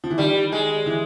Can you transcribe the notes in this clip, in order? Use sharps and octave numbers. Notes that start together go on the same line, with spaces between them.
F3
E3
D#3 G3
G#3
E3